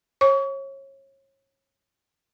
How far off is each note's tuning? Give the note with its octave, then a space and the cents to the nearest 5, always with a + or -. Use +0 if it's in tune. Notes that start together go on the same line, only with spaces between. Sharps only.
C#5 -30 C#6 +35